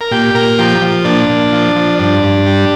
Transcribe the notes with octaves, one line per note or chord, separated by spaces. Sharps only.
A#4
A#2 G4
A#2 A#4
F3 G4
F3
A#2 D4
A#2
F3
F3
G2 D4
G2
G3